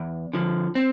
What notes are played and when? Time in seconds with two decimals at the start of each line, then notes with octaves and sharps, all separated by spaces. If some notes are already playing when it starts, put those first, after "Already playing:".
Already playing: E2
0.33 D3 F3
0.75 C4